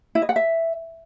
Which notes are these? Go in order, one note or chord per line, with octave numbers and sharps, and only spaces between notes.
E4
D#5
F#5
E5